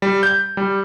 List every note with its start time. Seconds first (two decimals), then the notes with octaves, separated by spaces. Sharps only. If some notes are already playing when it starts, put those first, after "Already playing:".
0.02 G3
0.23 G6
0.57 G3